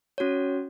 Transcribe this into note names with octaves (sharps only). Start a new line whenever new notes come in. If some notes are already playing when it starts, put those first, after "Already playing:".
C#4 F#4 C#5